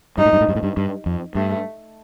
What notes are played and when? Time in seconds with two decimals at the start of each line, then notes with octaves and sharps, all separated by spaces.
0.18 G2 D#4
0.26 A2
0.33 G2
0.41 A2
0.48 G2
0.56 A2
0.63 G2
0.77 G2
1.06 F2
1.35 G2 A3